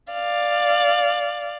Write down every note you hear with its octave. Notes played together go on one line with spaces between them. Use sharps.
D5 F5